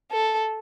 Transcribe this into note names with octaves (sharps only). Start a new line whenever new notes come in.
A4